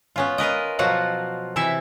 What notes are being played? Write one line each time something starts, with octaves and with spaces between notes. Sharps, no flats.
B3 C#4 F4
F4 A#4 B4 D#5
B2 F3 F#3 F4 F#4 F#5
C3 E3 E4 E5